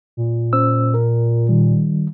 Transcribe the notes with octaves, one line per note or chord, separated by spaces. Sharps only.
A#2
C#4 C5 E6
A#4
D#3 G3